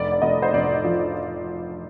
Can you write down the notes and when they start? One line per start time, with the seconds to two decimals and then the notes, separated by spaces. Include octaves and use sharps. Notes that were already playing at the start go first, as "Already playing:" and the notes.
Already playing: F1 D5
0.12 D5
0.22 F1 D#5
0.42 C5
0.53 F1 D5
0.85 F3